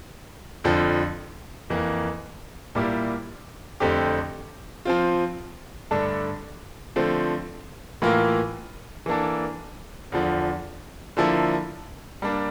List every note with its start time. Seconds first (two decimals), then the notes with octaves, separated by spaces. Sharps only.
0.64 F2 D3 F3
1.70 F2 E3 A#3
2.75 A#2 G3 A#3 E4 G4
3.80 F2 D3 A3 C4 G4
4.85 F3 C4 F4
5.91 G2 D3 A3 D4 A4
6.96 D3 F3 A3 C4
8.02 A2 E3 A#3 F4 A#4
9.06 E3 A#3 D4 A4
10.12 E2 D3 F3
11.17 D3 F3 A#3 E4 A4
12.22 G3 A#3 D4